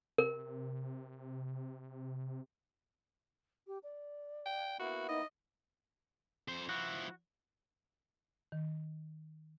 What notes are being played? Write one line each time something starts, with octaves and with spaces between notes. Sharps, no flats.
C3 A#4
G4
D5
G5
A#3 B3 E4 F#4
D#4 D#5
F2 C5
F3 E4 F#4
D#3